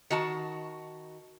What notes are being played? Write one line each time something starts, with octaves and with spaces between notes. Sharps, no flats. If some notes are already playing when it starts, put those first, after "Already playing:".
D#3 F#4 A5